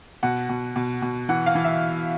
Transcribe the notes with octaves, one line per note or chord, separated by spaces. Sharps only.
B2 F#5
B2
B2
B2
E3 F#5
F5
E3
E5